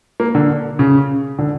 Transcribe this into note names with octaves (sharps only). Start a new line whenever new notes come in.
A#3
D3
C#3
D3